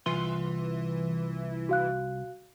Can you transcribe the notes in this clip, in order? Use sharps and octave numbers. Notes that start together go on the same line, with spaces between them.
C2 E3 F4 C6
F#4 F5 F#6